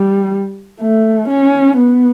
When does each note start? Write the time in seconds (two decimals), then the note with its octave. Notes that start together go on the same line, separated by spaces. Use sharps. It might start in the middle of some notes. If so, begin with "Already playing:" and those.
Already playing: G3
0.81 A3
1.29 C#4
1.77 B3